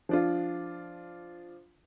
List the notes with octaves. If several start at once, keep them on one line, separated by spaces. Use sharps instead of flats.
F3 D4 F4